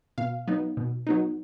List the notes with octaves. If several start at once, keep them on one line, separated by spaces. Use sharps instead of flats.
B2 F5
F#3 B3 D#4
B2
F#3 B3 D#4